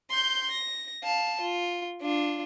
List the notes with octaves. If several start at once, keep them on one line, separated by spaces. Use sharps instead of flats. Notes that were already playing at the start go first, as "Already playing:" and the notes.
C6 G6
A#6
F5 A5
F4
D4 F4